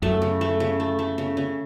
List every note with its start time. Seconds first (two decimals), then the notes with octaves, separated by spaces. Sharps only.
0.02 F#2 A3
0.22 C#3
0.41 A3
0.60 C#3
0.80 A3
0.99 A3
1.18 C#3
1.37 C#3